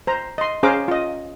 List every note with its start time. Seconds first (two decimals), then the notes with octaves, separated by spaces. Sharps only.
0.07 C5 A#5
0.38 D#5 C6
0.63 C#4 G#4 C5 F5 A#5 D6
0.88 F4 D#5